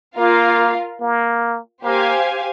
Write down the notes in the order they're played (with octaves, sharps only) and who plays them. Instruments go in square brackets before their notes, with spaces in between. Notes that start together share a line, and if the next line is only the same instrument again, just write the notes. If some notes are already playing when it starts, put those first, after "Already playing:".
[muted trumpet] A#3 [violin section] F4 A#4 F5
[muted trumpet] A#3
[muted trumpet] A#3 [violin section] G4 C5 F5 G#5